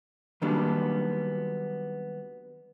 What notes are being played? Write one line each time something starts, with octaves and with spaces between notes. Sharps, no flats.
D#3 F#3 G3 A#3 B3 D4